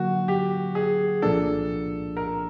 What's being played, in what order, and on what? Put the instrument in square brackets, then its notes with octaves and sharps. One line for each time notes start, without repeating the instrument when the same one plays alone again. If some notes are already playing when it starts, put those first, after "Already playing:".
Already playing: [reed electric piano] D3 F#3 A#3 [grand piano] F#4
[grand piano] G4
G#4
[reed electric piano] C2 A#2 F3 A#3 D4 [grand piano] A4
[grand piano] A#4